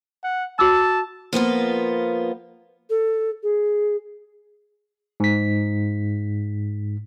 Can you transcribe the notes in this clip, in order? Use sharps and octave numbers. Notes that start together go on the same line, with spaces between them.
F#5
F#4 A5 D6 E6
F3 A#3 B3 F4
A4
G#4
G#2 B6